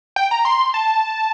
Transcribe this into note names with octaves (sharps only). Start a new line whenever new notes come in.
G5
A#5
C6
A5